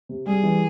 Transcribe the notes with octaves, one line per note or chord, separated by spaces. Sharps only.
C3
G3 G#4
E3